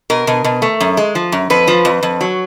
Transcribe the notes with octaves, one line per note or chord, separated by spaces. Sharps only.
B2 A#4
B2
B2
A3
F#2
G#3
F3
F#2
F2 B4
F3
F2
F2
F#3